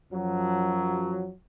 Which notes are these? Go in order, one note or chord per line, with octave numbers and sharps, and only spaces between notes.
F#2 F3 F#3